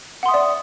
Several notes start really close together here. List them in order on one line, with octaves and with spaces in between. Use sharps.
F#5 C6 D#6 E5 D5